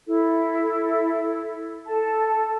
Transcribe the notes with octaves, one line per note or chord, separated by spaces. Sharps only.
E4 A4
A4 A5